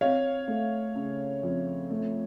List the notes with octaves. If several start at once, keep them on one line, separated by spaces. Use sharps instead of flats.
C4 C#5 F5
A3
C#3
F2
A3